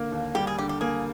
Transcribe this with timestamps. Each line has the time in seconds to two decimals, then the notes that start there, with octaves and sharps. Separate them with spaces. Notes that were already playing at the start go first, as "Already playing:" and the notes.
Already playing: D3 A#3
0.12 D#2
0.35 G3 G4
0.47 G#4
0.58 D3 G4
0.69 G4
0.81 A#3 G#4